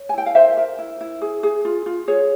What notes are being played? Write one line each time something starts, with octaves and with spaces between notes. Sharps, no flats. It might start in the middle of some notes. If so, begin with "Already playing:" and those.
Already playing: C#5
G#5
E4 G5
F5
A#4 C5 E5
A#4
E4
E4
G#4
G#4
F4
F4
G#4 C#5